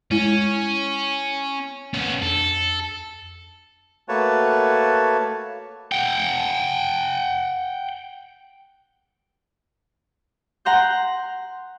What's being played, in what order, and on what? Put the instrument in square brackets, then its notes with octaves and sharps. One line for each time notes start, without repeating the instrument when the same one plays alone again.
[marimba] G#3 E4 [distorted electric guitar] C#4
[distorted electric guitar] B3 C#4
[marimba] F2 [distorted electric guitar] A4
[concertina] A3 A#3 F#4 B4 C#5 A5
[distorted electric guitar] F#5 G5
[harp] F#5 A#5 C6 G6